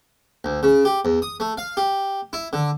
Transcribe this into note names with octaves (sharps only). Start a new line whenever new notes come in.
D2
C#3
G4
E2
D#6
A3
F5
G4
E4
D3